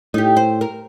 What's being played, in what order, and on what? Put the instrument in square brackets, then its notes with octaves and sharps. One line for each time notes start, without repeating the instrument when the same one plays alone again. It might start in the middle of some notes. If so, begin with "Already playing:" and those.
[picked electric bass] A2 [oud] D#4 G4
[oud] C5
A#4